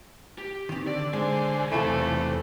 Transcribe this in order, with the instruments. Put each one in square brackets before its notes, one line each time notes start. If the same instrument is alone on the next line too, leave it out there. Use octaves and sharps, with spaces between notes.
[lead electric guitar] G4
[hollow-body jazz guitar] D#3 C4
[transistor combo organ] D3 [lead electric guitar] D5
[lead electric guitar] B1 G#5 [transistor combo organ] D3 C5 [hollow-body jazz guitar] G#3
[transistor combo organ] E2 C3 [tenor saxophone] A3 [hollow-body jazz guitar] E4 F4